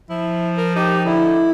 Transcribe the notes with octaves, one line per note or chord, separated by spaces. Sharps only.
F3 E4
A#4
D#4 G4
D3 E4